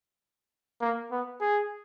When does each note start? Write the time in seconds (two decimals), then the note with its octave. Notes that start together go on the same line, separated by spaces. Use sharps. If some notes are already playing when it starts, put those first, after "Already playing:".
0.81 A#3
1.12 B3
1.41 G#4